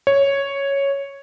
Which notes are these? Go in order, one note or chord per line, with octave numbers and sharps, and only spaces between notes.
C#5